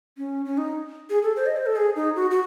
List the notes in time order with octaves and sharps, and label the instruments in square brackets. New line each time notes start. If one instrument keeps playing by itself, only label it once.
[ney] C#4
C#4
D#4
G#4
A4
C5
D#5
C5
A4
G#4
D#4
F#4
F#4